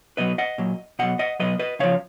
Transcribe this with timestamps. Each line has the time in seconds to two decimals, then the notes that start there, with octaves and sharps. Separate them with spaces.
0.17 B2 F#3 B4 D#5
0.38 D#5 F#5
0.58 A#2 F#3
0.99 B2 F#3 D#5 F#5
1.19 D#5 F#5
1.40 B2 F#3 B4 D#5
1.59 B4 D#5
1.79 C#3 F3 C#5 F5